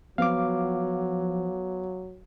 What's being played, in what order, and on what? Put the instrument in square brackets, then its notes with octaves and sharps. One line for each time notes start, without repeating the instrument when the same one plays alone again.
[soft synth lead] F3 [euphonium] F#3 [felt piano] B3 [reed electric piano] F5 D6